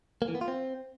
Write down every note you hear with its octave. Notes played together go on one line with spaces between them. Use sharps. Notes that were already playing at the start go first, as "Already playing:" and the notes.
A#3
E3
B3
F4
C4